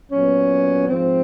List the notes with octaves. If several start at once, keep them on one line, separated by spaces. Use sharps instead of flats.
A#2 F#3 B3 C#4
G#2 F3 C4